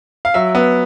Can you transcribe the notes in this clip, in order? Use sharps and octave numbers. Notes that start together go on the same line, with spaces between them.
F5
F#3 E5
B3